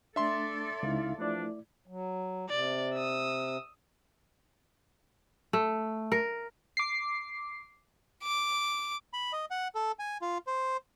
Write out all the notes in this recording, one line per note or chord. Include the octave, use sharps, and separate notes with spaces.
A3 D4 A4 D5 E5 C6
C#2 D#4 E4 F5
E3 F3 A3 D4 E4 D5
F#3
C3 D5
D#6 E6
A3
A#4
D6 C7
D6
B5
D#5
F#5
A4
G#5
F4
C5